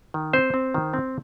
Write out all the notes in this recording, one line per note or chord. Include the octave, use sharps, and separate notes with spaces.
D#3
C4 C5
C4
D#3
C4